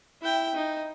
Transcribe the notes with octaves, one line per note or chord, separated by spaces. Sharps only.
E4 G5
D#4